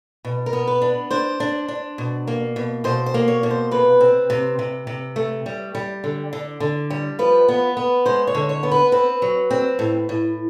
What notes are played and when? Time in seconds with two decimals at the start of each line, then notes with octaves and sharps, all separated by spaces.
0.25 B2
0.46 A#4
0.53 B3
0.67 B4
0.82 D4
1.11 D4 C5
1.40 D4
1.68 D4
1.98 B2
2.27 A#3
2.56 B2
2.84 B2 C5
3.06 C5
3.14 A#3
3.28 C#5
3.43 B2
3.51 C5
3.71 C3 B4
4.01 C4
4.30 C3
4.59 C3
4.87 C3
5.16 A3
5.46 G3
5.75 G3
6.04 D3
6.33 D3
6.60 D3
6.90 G3
7.19 F3 B4
7.48 B3
7.77 B3
8.06 G#3 C5
8.27 C#5
8.35 D3
8.49 C#5
8.63 B3
8.71 B4
8.92 C4 B4
9.22 F#3
9.51 C4
9.79 A2
10.09 A2